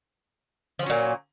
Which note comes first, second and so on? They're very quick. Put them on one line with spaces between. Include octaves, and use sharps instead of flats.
F3 C#4 F#3 A#2